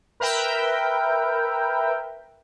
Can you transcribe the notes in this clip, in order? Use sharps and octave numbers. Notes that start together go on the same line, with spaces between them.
A#4 B4 E5 G5